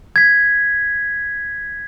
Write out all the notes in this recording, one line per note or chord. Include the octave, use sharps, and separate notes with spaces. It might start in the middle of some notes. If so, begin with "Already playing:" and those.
G#6 B6